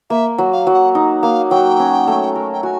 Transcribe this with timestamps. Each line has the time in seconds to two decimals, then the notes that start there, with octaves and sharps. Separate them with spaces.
0.10 A#3 E5
0.38 F#3
0.53 F5
0.67 F#3
0.74 F#5
0.95 D#4
1.22 A#3 F5
1.51 F#3 G5
1.80 C#4
2.07 A3
2.35 A#4
2.53 G5
2.63 F#4 G#5